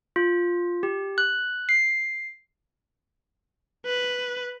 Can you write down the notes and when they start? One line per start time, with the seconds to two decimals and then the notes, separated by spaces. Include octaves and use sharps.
0.16 F4
0.83 G4
1.18 F#6
1.69 C7
3.86 B4